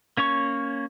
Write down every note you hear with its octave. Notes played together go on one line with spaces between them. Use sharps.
A#3 C#4 C#5 C#6